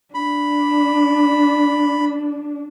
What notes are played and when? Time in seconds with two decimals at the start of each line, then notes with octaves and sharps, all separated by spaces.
0.15 D4 B5